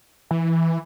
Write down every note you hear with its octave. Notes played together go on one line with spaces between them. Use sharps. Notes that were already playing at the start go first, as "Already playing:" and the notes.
E3